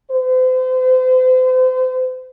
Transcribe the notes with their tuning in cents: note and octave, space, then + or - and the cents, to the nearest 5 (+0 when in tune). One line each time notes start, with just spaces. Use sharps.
C5 -35